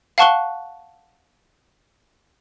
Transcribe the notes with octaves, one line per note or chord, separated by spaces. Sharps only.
F5 F#5 A5 C#6 F#6 G7